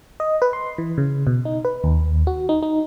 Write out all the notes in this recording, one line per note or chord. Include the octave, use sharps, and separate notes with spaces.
D#5
B4
C6
E3
C#3
B2
D#4
B4
D#2
F#4
D#4
D#4